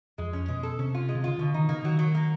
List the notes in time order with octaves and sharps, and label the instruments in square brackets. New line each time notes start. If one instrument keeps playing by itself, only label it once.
[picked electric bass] F2 [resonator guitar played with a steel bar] G#3
[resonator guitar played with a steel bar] C#4
[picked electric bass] B2 [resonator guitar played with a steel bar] G#3
[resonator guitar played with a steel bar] A4
[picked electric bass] C3 [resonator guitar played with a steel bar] C#4
[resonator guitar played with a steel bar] F4
G#3
[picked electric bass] C3
[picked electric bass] C#3 [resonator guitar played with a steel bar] F4
[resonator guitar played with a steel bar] B2 [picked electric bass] D3
[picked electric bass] D#3 [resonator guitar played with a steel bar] D#4
[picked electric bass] C#3 [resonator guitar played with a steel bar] A#3
[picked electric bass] D#3 [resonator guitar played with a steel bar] F#3
[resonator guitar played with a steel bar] F#3
A#3